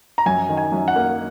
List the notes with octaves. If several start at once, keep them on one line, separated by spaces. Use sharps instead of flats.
A#5
F#2 G#5
D#3
G#5
F#2
F#5
A#3